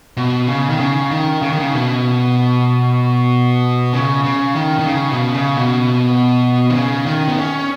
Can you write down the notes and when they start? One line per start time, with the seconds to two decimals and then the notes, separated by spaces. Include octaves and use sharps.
0.17 B2
0.47 C#3
0.70 D#3
0.80 C#3
1.11 D#3
1.42 C#3
1.51 D#3
1.59 C#3
1.74 B2
3.93 C#3
4.24 C#3
4.56 D#3
4.79 D#3
4.87 C#3
5.11 B2
5.34 C#3
5.57 B2
6.70 D#3
6.74 C#3
7.06 D#3
7.28 B3
7.38 C#4